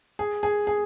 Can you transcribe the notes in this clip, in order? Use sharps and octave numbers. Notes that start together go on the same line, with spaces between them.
G#4
G#4
G#4